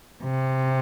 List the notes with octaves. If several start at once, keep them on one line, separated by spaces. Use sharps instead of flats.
C3